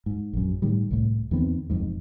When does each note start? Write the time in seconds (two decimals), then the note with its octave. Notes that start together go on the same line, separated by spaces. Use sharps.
0.06 G#2
0.33 A#1 F#2
0.62 A2 D#3 G3
0.91 C2 A2
1.31 E2 D#3 B3 C4
1.70 E1 F2 G#2